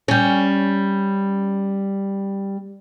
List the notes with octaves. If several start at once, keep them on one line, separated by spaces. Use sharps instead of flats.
G3 C#4